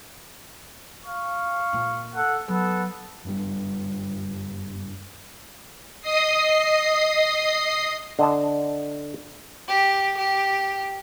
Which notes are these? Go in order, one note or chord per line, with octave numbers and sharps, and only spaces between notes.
F5 C#6
A#2
A4 F#5
F#3 B3 A4
F#1 G2 C#3 G3
D#5 D#6 C7
D3 D#5 A5
G4
G4